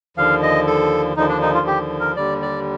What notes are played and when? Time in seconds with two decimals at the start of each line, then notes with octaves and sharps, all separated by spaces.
0.17 D#2 D3 F3 F5
0.43 D#5
0.67 A4
1.17 D#2 D3 F3 D#4
1.29 D4
1.42 D#4
1.54 F4
1.67 G4
2.00 A#4
2.16 D#2 D3 G3 D5
2.42 D5